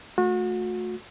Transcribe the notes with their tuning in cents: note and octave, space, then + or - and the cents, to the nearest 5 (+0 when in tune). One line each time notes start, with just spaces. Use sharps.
A3 +0 F#4 -35